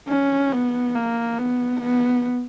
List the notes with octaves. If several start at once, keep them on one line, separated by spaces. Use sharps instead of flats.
C#4
B3
A#3
B3
B3